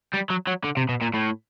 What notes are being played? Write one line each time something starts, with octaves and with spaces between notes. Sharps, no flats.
G3
F#3
F#3
D3
C3
B2
A#2
A2